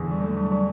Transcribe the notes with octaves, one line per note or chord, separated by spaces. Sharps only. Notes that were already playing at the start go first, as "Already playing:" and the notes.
Already playing: E2 D3
G3
F#3 A3
G3
G3 D4